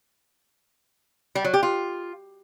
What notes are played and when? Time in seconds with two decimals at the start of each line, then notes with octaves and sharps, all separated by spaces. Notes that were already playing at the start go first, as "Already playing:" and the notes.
1.35 G3
1.44 F#3
1.54 G4
1.63 F4